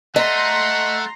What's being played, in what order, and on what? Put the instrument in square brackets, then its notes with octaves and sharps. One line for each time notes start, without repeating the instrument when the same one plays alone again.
[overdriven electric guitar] A3 [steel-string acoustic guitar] D#5 [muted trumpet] F#5 [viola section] A#5 C6